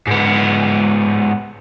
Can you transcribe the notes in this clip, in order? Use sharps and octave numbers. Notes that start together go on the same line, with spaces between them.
G#2 B3